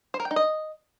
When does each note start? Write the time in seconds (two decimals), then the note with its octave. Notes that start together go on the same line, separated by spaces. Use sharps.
0.14 C5
0.20 A#4
0.25 G5
0.31 D#4
0.36 D#5